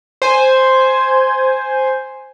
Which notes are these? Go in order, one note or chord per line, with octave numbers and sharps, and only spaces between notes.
C5 G#5